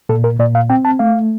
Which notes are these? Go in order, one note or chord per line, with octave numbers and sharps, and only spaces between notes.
A#2 A4
A#4
A#2 D5
F5
C4 G5
A5
A3 F5